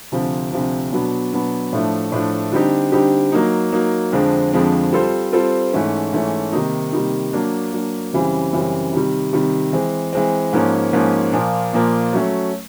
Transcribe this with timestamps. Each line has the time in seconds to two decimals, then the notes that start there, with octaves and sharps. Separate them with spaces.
0.12 D2 C3 F3
0.52 D2 C3 F3
0.92 B2 F#3 B3 D4
1.33 B2 F#3 B3 D4
1.73 A2 F3 A3 D4
2.12 A2 F3 A3 D4
2.52 D3 G3 C4 D#4 G4
2.92 D3 G3 C4 D#4 G4
3.32 F#3 A#3 D#4
3.72 F#3 A#3 D#4
4.12 F2 D3 F3 G#3 C4
4.52 F2 D3 F3 G#3 C4
4.93 G3 C4 F4 A4 C5
5.32 G3 C4 F4 A4 C5
5.73 G#2 E3 A3 C#4
6.12 G#2 E3 A3 C#4
6.52 C3 D#3 G3 A#3 D#4
6.92 C3 D#3 G3 A#3 D#4
7.33 F#3 A#3 D4
7.72 F#3 A#3 D4
8.12 F#2 C#3 E3 G3 C4
8.53 F#2 C#3 E3 G3 C4
8.93 C3 D#3 G3
9.33 C3 D#3 G3
9.73 E3 G#3 C4
10.13 E3 G#3 C4
10.53 G#2 F3 A#3 C#4
10.93 G#2 F3 A#3 C#4
11.33 A#2 F3 A#3
11.73 A#2 F3 A#3
12.13 F#3 A3 C#4